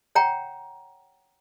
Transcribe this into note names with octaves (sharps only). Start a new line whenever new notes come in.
C#5 F#5 G5 A#5